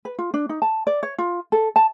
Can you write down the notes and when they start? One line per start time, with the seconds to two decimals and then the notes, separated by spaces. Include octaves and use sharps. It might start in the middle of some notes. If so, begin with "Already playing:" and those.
0.05 B4
0.19 F4
0.34 D4
0.49 D#4
0.62 A5
0.87 D5
1.03 C#5
1.18 F4
1.52 A4
1.76 A5